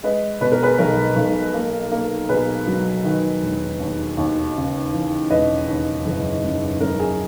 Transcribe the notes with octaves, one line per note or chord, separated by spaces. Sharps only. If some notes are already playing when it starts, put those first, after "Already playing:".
G#3 B4 D#5
B2 B4
A#4
G#4 B4
B1 A#4
B1
A#3
A#3
B2 G#4 B4
F#3
D#3
E1
D#2
D#2
C#3
E3
E1 B4 D#5
D#2
F#1
F#2
F#2 A#4
G#4